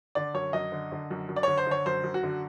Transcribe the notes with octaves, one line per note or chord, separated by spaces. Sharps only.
D3 D5
F#2 C#5
F#2 D#5
D3
D3
F#2
F#2
D5
D3 C#5
C5
D3
C#5
F#2 C5
F#2
F#4
D3